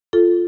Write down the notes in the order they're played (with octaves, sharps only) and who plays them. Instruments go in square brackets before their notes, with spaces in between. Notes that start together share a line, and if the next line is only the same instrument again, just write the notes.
[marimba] F4 A4